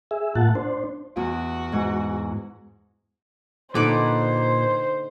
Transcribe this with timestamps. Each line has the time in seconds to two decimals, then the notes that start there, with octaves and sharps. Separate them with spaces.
0.11 G#4 E5
0.35 A2 A#3 F4 F#5 A5
0.55 D4 C5
1.17 E2 F#4
1.72 G#2
3.75 A#2 D3 D#4 B4 C5 D6